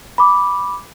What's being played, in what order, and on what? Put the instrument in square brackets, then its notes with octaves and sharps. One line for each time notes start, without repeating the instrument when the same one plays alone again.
[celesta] B5 D6